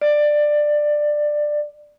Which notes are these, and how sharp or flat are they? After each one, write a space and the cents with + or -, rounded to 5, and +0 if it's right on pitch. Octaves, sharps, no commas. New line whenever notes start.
D5 +15